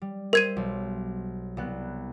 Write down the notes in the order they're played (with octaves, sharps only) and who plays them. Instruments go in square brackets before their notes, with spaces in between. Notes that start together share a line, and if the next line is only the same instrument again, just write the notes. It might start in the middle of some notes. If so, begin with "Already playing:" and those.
[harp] G3
[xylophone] A#4 G#6 D#7 [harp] C5 E5
[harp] B1
C2 B3 F#6